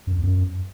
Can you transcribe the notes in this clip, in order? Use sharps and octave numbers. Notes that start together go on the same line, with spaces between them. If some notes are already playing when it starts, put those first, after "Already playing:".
F#2
F2
E2
F#2